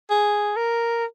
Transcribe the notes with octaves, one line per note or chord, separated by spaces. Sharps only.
G#4
A#4